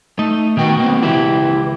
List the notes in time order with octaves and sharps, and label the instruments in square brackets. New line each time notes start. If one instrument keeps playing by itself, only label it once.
[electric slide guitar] A3 [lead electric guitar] D#4
[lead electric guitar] B2 F#4 [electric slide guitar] D#3 G5
[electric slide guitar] A#3 C4
[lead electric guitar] C#2 E3 [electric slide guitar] E4 G4